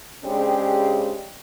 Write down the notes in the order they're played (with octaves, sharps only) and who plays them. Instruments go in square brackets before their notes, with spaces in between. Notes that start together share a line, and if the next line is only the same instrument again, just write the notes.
[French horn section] C#3 G#3 C4 D4 G4